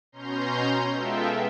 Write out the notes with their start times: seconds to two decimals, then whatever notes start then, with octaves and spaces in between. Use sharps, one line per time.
0.12 B2 C#4 A#5 C6 G6
0.92 G#3 B3 F4 A4 E5 G5